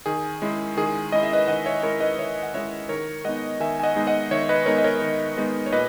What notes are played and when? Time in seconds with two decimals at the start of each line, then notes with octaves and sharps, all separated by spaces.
0.06 D#3 G#4
0.42 G#3 C#4 E4
0.77 D#3 G#4
1.12 G#3 C#4 E4 D#5
1.23 E5
1.33 B4 D#5
1.48 D#3 D#5 F#5
1.65 C#5 E5
1.83 G#3 C#4 E4 A#4 C#5
2.00 B4 D#5
2.18 D#3 C#5 E5
2.43 F#5
2.54 G#3 C#4 E4 C#5 E5
2.89 D#3 A#4 C#5
3.24 G#3 B3 D#4 D#5 F#5
3.60 D#3 E5 G#5
3.80 G#5
3.83 D#5 F#5
3.95 G#3 B3 D#4
4.07 D#5 F#5
4.31 D#3 C#5 E5
4.49 B4 D#5
4.66 G#3 B3 D#4 A#4 C#5
4.78 D#5
4.84 A#4 C#5
5.02 D#3
5.37 G#3 B3 D#4
5.66 C#5
5.72 A#2 B4 D#5